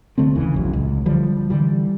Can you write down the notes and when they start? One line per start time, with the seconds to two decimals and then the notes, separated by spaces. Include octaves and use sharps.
0.18 D2 D3 A3 C4
0.35 F#1 D#2 C#3 E3
0.54 A#1 F#2
0.73 C#2
1.06 D3 F3 G3
1.50 D3 E3 G3